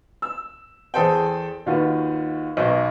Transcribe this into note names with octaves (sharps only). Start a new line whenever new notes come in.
E6
E2 G#4 A4 C5 G5
D#2 D#3 F4 F#4 B4
B1 B2